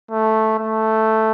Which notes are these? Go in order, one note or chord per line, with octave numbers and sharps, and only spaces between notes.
A3
A3